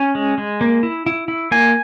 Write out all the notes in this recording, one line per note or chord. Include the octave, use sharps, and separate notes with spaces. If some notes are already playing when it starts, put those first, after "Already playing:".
Already playing: C#4 G#5
G#3
G#3
A#3
E4
E4
E4
A#3 G#5